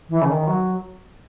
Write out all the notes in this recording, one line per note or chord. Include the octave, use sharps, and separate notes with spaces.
E3
C#3
D#3
F#3